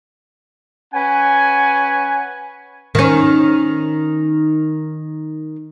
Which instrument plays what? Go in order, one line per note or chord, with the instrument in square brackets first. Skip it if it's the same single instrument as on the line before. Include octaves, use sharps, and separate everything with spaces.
[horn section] C#4 B4 F#5 G#5
[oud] D#3 C#4